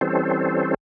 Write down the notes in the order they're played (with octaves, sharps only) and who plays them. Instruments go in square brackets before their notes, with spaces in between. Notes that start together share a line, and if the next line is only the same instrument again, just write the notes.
[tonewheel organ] E3 G3 C4 C#4 A4 C5